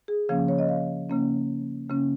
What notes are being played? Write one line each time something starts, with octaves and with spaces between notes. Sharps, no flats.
G#4
C#3 F3 A#3 C#4 F5
C#5
D#5
F5
C#3 A#3 C#4
C#3 A#3 C#4